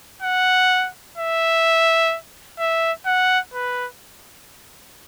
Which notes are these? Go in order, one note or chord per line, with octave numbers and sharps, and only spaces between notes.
F#5
E5
E5
F#5
B4